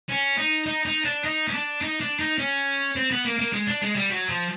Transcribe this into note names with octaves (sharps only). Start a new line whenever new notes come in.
C#4
D#4
D#4
D#4
D4
D#4
C#4
D4
D#4
D4
D#4
C#4
C4
B3
A#3
A#3
G#3
D4
G#3
G3
F#3
F3